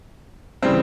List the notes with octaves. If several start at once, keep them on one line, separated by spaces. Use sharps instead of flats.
C#3 E3 G3 C4